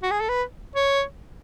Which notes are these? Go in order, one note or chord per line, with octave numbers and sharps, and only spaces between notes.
F#4
G#4
A4
B4
C#5